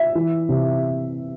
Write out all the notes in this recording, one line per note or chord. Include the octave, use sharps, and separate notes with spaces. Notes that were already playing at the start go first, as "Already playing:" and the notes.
Already playing: E5
E3
C3